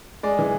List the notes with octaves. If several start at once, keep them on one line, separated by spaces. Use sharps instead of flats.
G#3 D5
E3